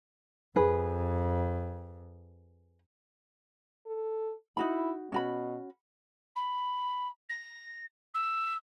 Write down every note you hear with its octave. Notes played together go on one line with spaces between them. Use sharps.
F2 G#4 B4
A4
D#4 E4 F#4 B5
B2 C#4 F#4 B5
B5
A#6
E6